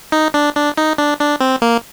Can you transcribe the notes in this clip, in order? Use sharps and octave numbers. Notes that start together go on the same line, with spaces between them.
D#4
D4
D4
D#4
D4
D4
C4
A#3